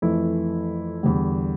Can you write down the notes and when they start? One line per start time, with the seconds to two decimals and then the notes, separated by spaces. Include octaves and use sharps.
0.02 F2 E3 A3 E4
1.03 E2 D3 G3